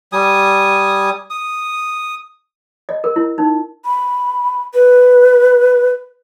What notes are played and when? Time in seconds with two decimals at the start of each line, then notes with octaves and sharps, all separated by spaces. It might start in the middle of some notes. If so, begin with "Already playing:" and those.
0.12 G3 G#5 D#6
1.30 D#6
2.89 D#5
3.04 A#4
3.16 E4
3.38 D#4
3.85 B5
4.74 B4